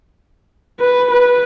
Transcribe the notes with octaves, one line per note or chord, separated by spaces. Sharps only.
B4
B4